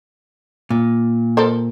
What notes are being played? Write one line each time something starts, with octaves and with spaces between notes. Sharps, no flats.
A#2
A4 A#4 C5